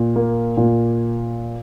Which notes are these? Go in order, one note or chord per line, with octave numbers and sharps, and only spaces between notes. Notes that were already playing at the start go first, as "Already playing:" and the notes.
Already playing: A#2
A#3
A#2